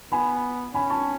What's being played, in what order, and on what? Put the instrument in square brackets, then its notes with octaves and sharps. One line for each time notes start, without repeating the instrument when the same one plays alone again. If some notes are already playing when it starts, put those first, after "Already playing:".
[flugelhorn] B3 [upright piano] G#5 B5
[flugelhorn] C#4 [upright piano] G#5 B5
[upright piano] A5 C#6